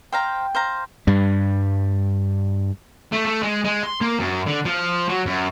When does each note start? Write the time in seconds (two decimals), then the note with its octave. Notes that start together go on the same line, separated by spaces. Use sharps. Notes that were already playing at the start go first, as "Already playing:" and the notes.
0.12 C5 F5 G5 A#5
0.55 C5 F5 A#5
1.07 G2 G3
3.12 A3
3.25 A3
3.43 G#3
3.64 G#3
3.83 C6
4.01 A#3
4.19 F#2
4.47 D3
4.65 F3
5.09 F#3
5.26 F#2